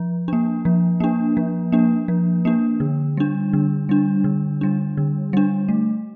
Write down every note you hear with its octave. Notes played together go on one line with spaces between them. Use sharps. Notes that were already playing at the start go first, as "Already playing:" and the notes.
Already playing: F3
A#3 D4
F3
A#3 D4
F3
A#3 D4
F3
A#3 D4
D3
G3 D4
D3
G3 D4
D3
G3 D4
D3
G3 D4
A3